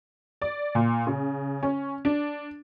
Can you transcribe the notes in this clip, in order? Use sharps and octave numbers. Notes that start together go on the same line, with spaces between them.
D5
A#2
C#3
C#4
D4